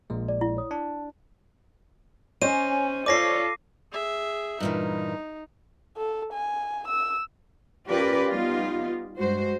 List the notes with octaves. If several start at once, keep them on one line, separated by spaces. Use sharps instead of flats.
A#1 A#2 G#3
D5
E4
C#5 D#6
D4 A5
C#4 C5 C#5 D#5 G#5 D#7
F4 A4 C#5 D5 D6 A#6 C7
G#4 E5
G2 A#2 E3 D#4
A4
G#5
E6
C#4 F4 G4 A#4 B4 D5
G3 B3 D#4 F4 G4
G2 G#3 F#4 C5